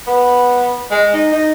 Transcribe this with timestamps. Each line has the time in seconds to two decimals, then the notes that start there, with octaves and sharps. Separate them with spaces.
0.07 B3
0.91 G#3
1.14 D#4
1.33 D#4